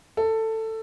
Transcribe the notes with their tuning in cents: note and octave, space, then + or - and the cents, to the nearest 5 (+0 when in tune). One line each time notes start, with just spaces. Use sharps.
A4 +15